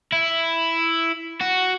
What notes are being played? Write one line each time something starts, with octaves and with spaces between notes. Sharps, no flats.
E4
F#4